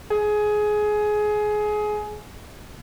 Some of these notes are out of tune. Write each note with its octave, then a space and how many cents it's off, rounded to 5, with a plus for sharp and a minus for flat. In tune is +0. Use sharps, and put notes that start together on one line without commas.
G#4 +20